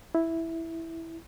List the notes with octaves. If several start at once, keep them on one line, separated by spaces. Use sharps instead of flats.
E4